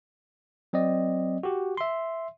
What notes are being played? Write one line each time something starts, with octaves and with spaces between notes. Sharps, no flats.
F#3 C4 D5 D#5
F#4 G4
E5 C6